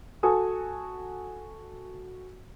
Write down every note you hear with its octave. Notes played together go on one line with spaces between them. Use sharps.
F#4 A4 G#5 D#6